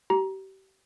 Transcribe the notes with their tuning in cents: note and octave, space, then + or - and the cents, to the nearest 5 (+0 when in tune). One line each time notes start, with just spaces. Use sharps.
G4 -35 A#5 +20